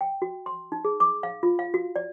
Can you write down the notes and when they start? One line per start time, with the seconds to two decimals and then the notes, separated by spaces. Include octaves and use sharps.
0.01 G5
0.22 F#4
0.46 C6
0.72 D#4
0.85 G#4
1.00 D6
1.23 F5
1.43 F4
1.59 F5
1.74 F#4
1.96 D5